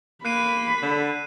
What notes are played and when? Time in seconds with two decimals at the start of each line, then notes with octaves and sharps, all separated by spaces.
0.25 A#3 B5 F#6 C7 D#7
0.83 D3